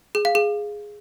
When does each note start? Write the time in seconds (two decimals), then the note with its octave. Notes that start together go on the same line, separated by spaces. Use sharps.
0.15 G#4
0.25 F5
0.35 G#4